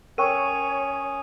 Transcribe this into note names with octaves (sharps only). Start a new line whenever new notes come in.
C#4 A#4 C#5 G5 C#6 D#6 D#7